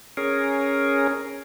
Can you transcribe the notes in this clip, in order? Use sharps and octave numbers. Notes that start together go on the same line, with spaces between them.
C#4 G#4 A#4